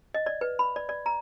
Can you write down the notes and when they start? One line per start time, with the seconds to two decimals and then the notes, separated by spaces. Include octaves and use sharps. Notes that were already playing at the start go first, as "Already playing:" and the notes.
0.14 D#5
0.26 D5
0.41 B4
0.59 B5
0.76 D5
0.89 D5
1.06 A#5